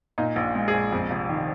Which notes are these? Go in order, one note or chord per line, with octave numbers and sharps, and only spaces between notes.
A#2 D#4
A#1
G#3
G#4
A#1
F2
F1
D#3